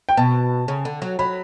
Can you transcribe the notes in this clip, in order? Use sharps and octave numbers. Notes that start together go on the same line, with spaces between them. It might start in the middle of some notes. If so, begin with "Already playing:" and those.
G5
B2 A5
C#3
D3
F#3
F#3 B5